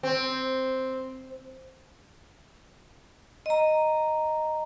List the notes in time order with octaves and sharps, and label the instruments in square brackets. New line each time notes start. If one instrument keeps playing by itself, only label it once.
[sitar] C4
[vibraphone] D#5 A#5